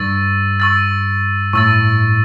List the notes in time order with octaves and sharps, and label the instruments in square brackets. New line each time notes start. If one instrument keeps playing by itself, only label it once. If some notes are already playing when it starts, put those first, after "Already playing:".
Already playing: [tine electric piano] G2 [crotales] C#6 E6 A6
[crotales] C#6 E6 A6
[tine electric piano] A2 [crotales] C#6 E6 A6